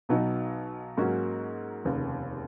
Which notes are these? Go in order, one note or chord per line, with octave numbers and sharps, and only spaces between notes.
B1 B2 F#3 B3 D#4
G#2 F#3 A#3 C#4 F#4
F1 D#2 C#3